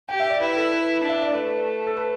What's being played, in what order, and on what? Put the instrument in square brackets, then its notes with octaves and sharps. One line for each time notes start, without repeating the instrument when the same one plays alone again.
[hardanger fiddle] G4 [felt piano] G5
[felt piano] E5
D5
[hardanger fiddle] E4 [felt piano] B4
[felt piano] A4
B4
[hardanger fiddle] D4
[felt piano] E5
D5
[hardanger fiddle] A3 [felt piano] B4
[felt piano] A4
B4